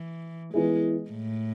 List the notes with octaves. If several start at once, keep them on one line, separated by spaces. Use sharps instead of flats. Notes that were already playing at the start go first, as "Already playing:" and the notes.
Already playing: E3
E3 G#3 B3 E4 G#4
A2